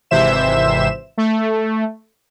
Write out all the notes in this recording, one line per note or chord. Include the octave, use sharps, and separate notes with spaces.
G#1 C3 E3 C5 E5 E7
A3